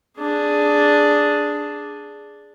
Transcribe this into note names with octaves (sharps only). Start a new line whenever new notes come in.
D4 G#4